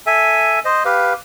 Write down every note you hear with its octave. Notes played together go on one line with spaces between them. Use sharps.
A4 E5 G#5
C5 D#5
G4 B4 F5